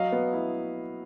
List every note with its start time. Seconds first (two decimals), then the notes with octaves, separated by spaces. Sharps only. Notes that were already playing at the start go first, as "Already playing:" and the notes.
Already playing: F#3 D#5 F5
0.12 B3
0.33 E4